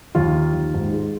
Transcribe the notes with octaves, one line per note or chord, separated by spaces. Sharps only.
D#2 F4
D#3
D#2
G#2
G#3